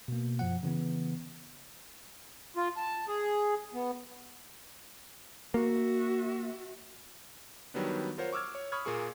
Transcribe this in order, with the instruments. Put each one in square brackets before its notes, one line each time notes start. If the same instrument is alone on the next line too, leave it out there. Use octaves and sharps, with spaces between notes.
[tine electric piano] B2 A#3
F#2 F3 F#5
C#3 E3 B3
[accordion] F4
A5
G#4
B3
[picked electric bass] A#3 [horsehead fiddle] F#4 E5
[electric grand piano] D#3 F#3 G3 B3 D4
F4 A#4 C5 C#5 F#5
C#6 D6 E6 F6 G#6
C#5
B5 C#6 D#6 F6 G#6
A#2 A#3 G#4 C#6